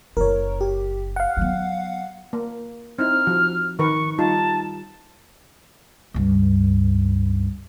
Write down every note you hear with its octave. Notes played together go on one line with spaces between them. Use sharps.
F#1 E4 A#4 C#5
G4
F5 F#5
F#3 B3
A#3
C4 D#4 E4 F6
F3 F#4
D#3 A#4 B4 C#6
G3 D#4 F4 A5
C#2 G2